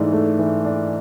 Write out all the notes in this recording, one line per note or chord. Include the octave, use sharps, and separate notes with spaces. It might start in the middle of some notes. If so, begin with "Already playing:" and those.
Already playing: G#2 E3 A3 D4
A3
E3
D4